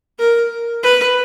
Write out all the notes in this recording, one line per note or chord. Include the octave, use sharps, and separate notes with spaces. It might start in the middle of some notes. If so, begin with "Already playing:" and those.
A#4
B4